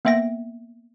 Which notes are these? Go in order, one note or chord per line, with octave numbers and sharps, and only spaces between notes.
A#3 B3 E5 G5 A#6